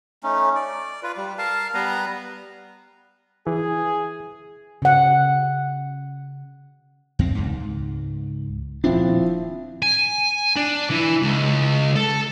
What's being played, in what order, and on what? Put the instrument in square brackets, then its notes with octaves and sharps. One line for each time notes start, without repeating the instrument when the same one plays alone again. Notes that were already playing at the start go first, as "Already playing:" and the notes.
[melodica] A3 C#4 D#4
D5
F4 B4
G3
A#4 F5 A5
G3 B3 B4 A#5
[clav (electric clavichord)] E3 [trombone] G#4
[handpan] C#3 F#5
[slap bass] E2 C4
C#2 G#2
[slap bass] D#1 D4 [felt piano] F3 C4 E4
[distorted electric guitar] G#5
D4
E3
C#2
A4